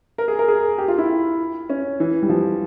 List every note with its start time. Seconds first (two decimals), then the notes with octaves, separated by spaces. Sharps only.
0.18 A#4
0.28 G#4
0.39 A#4
0.48 G#4
0.78 G4
0.88 F4
0.98 E4
1.69 C#4
2.00 E3
2.23 G3
2.29 F3